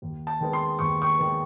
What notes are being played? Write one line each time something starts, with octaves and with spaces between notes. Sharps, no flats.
D#2
A5
D#3 G#3 B3
C6
D#2 C#6
C#6
D#3 G#3 B3